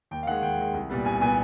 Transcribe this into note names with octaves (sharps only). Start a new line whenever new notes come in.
D#2 G5
F5
D#3 G#3 F#5
D#2 G5
D#3 G#3
C2
A#2 G3 B3
C2 G#5
A#2 G3 B3 G#5